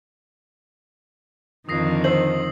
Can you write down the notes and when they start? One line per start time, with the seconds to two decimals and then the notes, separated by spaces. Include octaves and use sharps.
1.69 F2 D3 D#3 D#6 A#6 C7
2.04 C5 E6 C7 F#7